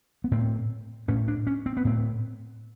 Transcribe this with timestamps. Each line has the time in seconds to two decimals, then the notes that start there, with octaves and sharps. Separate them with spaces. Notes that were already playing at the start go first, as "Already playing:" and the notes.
0.24 B3
0.31 A2 C4
1.08 A2 C#4
1.28 D4
1.47 C#4
1.66 C4
1.77 B3
1.85 A2 C4